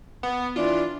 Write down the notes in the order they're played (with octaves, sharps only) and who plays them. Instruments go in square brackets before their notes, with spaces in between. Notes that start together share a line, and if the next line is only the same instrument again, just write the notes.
[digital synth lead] B3
[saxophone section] E3 D4 [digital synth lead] F4